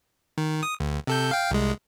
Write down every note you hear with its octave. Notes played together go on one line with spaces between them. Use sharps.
D#3
D#6
D2
C3 A4 G6
F5 G5
C2 G#3